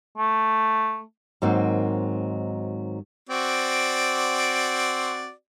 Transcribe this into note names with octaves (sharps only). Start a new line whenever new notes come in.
A3
G#2 D#3 F#3 A#3 C4 F#4
C4 F#4 D5